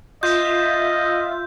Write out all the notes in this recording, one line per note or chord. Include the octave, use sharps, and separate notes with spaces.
F4 D#5 E5 G6